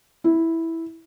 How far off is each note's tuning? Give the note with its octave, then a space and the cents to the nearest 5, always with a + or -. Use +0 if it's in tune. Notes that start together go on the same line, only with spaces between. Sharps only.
E4 -5